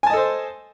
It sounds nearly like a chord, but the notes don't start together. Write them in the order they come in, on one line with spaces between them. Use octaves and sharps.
G#5 A5 D#5 A4 C5